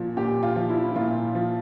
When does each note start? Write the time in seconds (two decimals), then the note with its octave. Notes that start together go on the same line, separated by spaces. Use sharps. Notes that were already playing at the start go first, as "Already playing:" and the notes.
Already playing: A#2 F3
0.17 A#2 G4
0.43 F4
0.56 F3
0.69 E4
0.84 E4
0.96 A#2 F4
1.35 F3